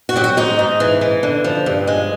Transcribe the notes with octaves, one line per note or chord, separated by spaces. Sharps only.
F#4
F#3 G4
F#4
G#2 D#4
G#2
E3
E3
D3
F3
G2
G#3